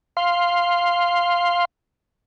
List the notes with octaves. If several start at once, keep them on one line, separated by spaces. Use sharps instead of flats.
F5 C6